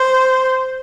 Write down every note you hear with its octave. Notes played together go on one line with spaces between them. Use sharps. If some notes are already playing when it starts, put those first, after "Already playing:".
Already playing: C5